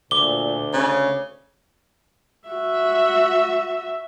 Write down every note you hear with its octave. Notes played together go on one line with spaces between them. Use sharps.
D2 A#2 D6 G7
C#3 C#4
F#4 E5